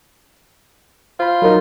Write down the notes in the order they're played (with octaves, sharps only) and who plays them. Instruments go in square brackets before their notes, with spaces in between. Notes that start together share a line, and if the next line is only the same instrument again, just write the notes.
[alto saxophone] F4 [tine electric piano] C5 B5
[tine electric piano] F#3 D#4 [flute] A#4